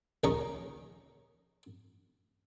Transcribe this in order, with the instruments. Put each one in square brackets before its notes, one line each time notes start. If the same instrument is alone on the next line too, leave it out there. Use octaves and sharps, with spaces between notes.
[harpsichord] A#1 D#2 C#4 D#5 A#5 C#6